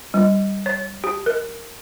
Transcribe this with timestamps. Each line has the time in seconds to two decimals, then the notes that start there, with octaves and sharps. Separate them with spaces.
0.14 G3
0.66 C#5
1.04 G4
1.26 A#4